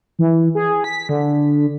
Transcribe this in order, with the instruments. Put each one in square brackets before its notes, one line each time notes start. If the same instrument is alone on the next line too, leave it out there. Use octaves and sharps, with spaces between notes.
[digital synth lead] E3
G#4
B6
D3